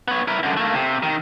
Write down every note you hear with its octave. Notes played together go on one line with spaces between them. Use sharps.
B3 C#5
E4 A#4
F#2 D3
A3 A#3
C3
D#3